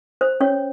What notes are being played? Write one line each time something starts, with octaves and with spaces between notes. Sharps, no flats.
C5
C#4 C#5